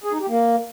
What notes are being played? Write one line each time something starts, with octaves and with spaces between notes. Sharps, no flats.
G#4
D#4
G4
A#3